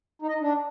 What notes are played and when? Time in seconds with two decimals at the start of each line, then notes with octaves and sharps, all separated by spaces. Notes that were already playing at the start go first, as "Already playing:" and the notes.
0.22 D#4
0.28 D#5
0.35 D#4
0.41 D4